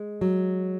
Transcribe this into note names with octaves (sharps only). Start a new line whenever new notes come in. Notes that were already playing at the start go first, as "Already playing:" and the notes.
Already playing: G#3
F#3